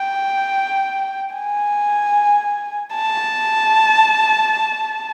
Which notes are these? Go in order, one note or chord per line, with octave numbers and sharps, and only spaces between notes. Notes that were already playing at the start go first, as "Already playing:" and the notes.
Already playing: G5
G#5
A5